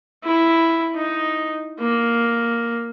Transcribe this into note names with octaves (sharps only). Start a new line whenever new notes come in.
E4
D#4
A#3